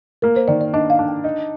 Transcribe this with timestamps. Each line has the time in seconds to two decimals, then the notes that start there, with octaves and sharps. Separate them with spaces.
0.22 A#3 A#4
0.36 C5
0.48 D#3 D5
0.61 D5
0.74 D4 D#5
0.90 F5
0.99 D4
1.08 G5
1.24 D#4